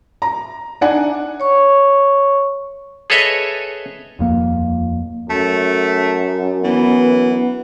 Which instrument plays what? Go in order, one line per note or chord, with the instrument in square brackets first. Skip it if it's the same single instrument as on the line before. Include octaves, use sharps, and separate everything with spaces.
[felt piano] A#5
D4 D#4 D5 F#5 G#5
[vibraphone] C#5 C#6
[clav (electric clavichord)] G#4 A4 B4 C#5 D#5 E5
[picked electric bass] D#1 F2 A#3
[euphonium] F#2 [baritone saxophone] A3
[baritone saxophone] E3 [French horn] B3